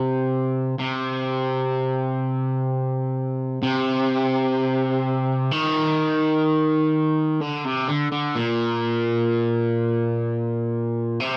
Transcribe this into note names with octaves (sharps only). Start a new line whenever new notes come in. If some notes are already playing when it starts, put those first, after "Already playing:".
Already playing: C3
C3
C3
D#3
D3
C3
D3
D3
A#2
C3